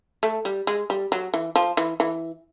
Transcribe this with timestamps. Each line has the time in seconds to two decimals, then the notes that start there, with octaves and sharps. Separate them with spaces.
0.23 A3
0.45 G3
0.67 G#3
0.90 G3
1.12 F#3
1.34 E3
1.56 F3
1.77 E3
2.00 E3